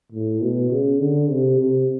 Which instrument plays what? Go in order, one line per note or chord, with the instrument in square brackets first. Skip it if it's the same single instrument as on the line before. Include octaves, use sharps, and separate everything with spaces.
[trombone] A2
B2
C#3
D3
C3
C3